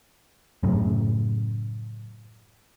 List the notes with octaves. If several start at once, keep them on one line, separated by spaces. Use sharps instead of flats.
F#2 A2 C#3